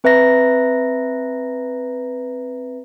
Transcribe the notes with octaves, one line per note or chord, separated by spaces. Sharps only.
C4 B4 E5 A#5 A#6